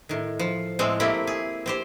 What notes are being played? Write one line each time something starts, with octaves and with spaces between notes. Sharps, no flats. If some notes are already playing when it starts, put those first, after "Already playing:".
A2 D#3
F3
A2 G#3 A3 C4
A3 A#3 C4 E4 G4
G#4
C4 G4 C5